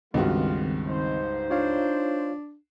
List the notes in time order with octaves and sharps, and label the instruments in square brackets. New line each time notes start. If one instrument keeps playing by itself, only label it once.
[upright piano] C#2 G2 F#4 [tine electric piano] D#3 C4 [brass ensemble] G3 F4
[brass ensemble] D#4 C5
[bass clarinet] D4 [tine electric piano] F4 C#5 F5